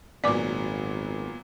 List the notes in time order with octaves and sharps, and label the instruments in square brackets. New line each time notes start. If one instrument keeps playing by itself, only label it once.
[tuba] G#1 [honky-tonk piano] A#2 F#3 B3 [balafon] D5 G#5 D6